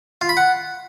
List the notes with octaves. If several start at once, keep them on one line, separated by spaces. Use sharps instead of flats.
F4
B5
F#5